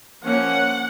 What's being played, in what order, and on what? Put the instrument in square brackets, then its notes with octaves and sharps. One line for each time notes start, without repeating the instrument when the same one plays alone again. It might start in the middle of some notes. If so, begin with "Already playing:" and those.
[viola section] F3 A#3 C#4 F#5